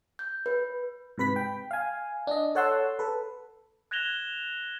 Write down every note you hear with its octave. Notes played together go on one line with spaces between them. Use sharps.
G6
B4
G#2 C3 B4 B5 B6
G5
F5 G#5
D4 D#5
A4 C#5 F#5 A5 C6 E6
A4 B4
F#6 G#6 A#6 E7 F7 G7